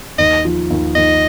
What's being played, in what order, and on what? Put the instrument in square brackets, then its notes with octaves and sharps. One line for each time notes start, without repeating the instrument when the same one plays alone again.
[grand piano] D#2 [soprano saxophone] D#5
[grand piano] F3
D#2
[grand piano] D#2 [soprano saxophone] D#5